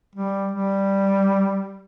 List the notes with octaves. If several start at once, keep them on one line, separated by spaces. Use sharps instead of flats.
G3
G3